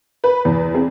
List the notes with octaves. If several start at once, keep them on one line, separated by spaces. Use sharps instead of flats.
B4
E2
C4 G#4